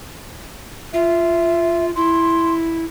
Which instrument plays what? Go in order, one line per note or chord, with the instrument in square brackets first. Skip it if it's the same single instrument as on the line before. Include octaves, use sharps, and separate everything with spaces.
[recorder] F4 [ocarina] E5
[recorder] E4 [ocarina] C6